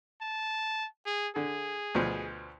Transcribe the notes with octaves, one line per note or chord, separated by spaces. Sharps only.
A5
G#4
D3 G#4
D2 B2 F3